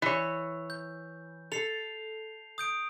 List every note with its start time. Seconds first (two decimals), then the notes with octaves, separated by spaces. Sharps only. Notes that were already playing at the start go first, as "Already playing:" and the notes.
0.02 E3 C#5
0.70 G6
1.52 A4 C7 F7
2.58 D#6 G6 D7